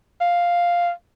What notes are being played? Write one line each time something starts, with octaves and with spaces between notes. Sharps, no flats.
F5